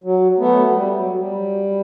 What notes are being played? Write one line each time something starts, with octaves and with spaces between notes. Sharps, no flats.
F#3
A3 B3
F#3
G3
F#3
G3